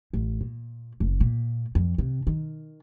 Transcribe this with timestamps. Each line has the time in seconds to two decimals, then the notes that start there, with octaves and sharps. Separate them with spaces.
0.13 A1
0.41 A#2
1.00 F#1
1.20 A#2
1.75 F2
1.98 C3
2.27 D#3